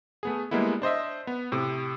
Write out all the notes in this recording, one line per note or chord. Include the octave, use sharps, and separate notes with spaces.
A3 B3 G#4
G3 G#3 A#3 B3 E4
D4 C5 D#5 E5
B3
A2 C3